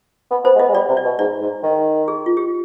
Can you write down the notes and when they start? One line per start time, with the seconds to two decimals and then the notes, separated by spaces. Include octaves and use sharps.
0.31 B3
0.44 B3 C5
0.56 G#3
0.59 B3 D#5
0.69 G#3
0.74 G3 D5
0.89 C3
0.97 D5
1.04 B2
1.19 G#2 D5
1.41 G#2
1.63 D#3
2.08 G#4
2.26 F4
2.37 G4